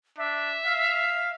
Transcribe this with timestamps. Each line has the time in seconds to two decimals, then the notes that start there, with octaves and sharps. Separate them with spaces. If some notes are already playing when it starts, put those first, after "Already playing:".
0.18 D4 E5
0.66 F5